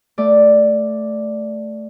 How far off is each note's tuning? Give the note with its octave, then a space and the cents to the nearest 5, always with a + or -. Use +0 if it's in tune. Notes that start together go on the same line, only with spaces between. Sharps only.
A3 +0 D5 +0